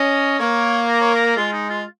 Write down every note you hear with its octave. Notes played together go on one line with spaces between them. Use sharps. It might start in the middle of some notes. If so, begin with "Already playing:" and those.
Already playing: C#4 D#5
A#3 C#5
A#4
C#5
A#4
G#3 F4
D#4
F4